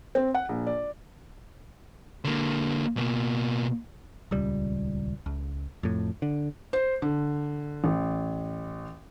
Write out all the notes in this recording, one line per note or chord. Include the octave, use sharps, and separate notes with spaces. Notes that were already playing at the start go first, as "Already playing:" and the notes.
C4
F#5
A#1
D5
D3 A#3
B2 A#3
D#1 C#2 G3
C#2
F2 A2
D3
C5
D3
A1